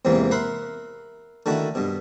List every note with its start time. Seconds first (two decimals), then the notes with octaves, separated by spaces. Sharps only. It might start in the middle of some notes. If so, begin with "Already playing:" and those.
0.05 E2 G#2 C3 E3 A#3
0.31 A#4 E5 F#5 B5 C6
1.46 D3 D#3 A3 E4 F#4
1.75 G2 B2